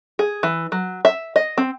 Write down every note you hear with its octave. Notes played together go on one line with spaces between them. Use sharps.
G#4
E3
F#3
E5
D#5
C4